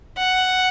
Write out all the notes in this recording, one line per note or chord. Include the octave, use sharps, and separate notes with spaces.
F#5